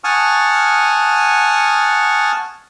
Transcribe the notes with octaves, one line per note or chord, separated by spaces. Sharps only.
F#5 G#5 A5 C#6 D#6 F6